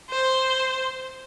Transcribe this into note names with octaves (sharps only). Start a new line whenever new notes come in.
C5